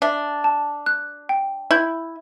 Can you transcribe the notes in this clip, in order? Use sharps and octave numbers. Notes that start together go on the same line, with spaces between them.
D4 E5
A5
F#6
G5
E4 G6